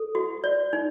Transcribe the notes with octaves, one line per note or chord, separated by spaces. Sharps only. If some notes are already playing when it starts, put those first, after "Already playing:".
Already playing: A4
F#4
D5
D#4